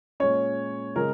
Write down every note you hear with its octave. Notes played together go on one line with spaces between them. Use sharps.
A#2 G#3 C#4 C#5
C#3 G#3 A#4